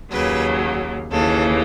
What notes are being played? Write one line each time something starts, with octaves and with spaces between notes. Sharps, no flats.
D#2 C#3 F#3 B4
D#2 C#3 E3 A4